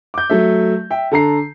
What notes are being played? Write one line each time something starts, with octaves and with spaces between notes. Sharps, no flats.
D6 G6
F#3 A3 E5
E5 G5
D3 A4 A#5 C7